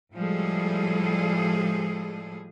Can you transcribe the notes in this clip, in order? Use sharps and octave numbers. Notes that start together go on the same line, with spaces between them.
A2 F3 G3 G#3 G#4 A4